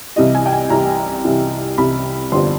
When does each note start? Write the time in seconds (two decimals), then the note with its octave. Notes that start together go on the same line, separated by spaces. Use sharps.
0.16 C2 C3 E3 G3 D#5
0.35 G#5
0.46 G5
0.53 G#5
0.70 C2 C3 E3 G3 A#5
1.25 C2 C3 E3 G3
1.78 C2 C3 E3 G3 B5
2.32 G1 F2 D3 G3 C4 C6